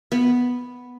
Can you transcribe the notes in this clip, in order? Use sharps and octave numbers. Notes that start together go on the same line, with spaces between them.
B3